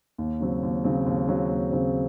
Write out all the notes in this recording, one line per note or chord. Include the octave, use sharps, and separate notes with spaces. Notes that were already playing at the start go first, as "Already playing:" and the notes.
D#2
C#3 F#3 C4
D#2
C#3 F#3 C4
D#2
C#3 F#3 C4
D#2
C#3 F#3 C4